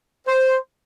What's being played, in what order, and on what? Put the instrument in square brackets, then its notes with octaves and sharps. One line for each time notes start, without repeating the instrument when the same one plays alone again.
[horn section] C5